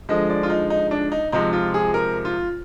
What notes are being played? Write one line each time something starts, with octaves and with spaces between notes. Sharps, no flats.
D3 F3 G#3 D#5
D5
F4
D#4
D#4
D4
D#4
C3 F3 G#3 D#4
F4
G#4
A#4
F4